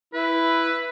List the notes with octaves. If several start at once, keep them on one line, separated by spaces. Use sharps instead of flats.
E4 B4